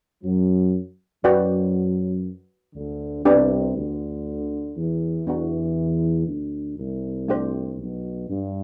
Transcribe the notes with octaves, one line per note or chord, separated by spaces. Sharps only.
F#2 F#3
F#2 F#3 F#4 B4 D5 G5
D2 D3
C2 C3 B3 D4 G4 B4 D5
D2 D3
E2 E3
E2 E3 B3 D4 F#4
D2 D3
C2 C3
A3 D4 G4 C5
B1 B2
G2